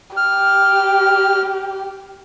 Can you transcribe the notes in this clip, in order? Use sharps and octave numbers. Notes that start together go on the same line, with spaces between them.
G4 F6